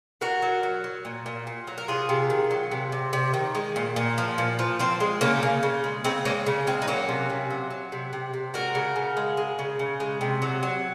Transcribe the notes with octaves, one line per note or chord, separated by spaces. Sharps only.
F#3 F#4 A#4
F#3
F#3
F#3
A#2
A#2
A#2
F#3
A#4
C3 F4 G#4
C3
D#3
F#3
C3
C3
C3
D#3
G#3
A#2
A#2
F3
A#2
F3
F3 C4
G#3
C#3 A#3 C#4
C#3
C#3
G#3
C#3 C4 D#4
G#3 A#3 C#4
C#3
G#3 C4
D#4
F#3 A#3 C#4
C3
C3
F#3
F#3
C3
C3
C3
G#3 F#4 A#4
C#3
C#3
G#3
G#3
C#3
C#3
G#3
C3
F#3
F#3